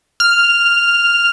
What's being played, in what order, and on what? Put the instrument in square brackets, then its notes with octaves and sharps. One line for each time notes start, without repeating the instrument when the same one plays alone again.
[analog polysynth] F6